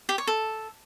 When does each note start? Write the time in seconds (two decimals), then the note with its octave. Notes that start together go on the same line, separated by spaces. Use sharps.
0.09 G4
0.18 C#5
0.27 A4